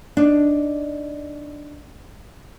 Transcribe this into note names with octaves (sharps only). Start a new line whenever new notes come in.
D4 D#4